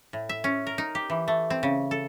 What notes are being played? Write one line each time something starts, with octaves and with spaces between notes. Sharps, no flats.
A2
E5
C#4
A#4
D#4
G4
E3
A3
C4
C#3
A4